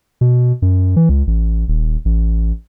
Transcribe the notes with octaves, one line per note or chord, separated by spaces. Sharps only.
B2
F#2
E3
C#2
A1
D#1
A1